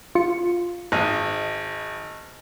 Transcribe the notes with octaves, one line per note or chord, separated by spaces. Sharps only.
F4 C#7
G#1 D#5